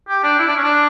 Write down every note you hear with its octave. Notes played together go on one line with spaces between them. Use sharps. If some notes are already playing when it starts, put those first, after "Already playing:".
G4
D4
E4
D4
C#4
D4